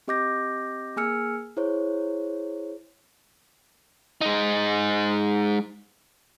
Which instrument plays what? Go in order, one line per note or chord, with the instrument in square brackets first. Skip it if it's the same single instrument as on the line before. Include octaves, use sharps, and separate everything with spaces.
[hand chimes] C4 G4 D#5 D6 G6 A#6
A#3 G#4 G#5 E6 F6 C#7
E4 G#4 C5 C#5
[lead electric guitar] G#3 D#4